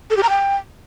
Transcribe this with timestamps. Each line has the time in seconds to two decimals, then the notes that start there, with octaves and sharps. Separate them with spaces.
0.10 A4
0.17 G4
0.23 A#5
0.29 G5